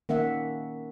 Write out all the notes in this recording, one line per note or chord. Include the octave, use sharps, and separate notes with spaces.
D#3 A#3 C#4 E5 F#5